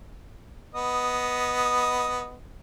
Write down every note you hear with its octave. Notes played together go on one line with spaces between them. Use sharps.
B3 D#5